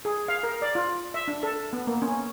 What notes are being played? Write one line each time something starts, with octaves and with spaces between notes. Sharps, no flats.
G#4
F5
A#4
D5
F4
E5
D4
A4
B3
A#3
C#4